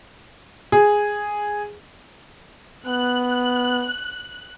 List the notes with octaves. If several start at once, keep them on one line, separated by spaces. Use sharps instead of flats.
G#4
B3 F#6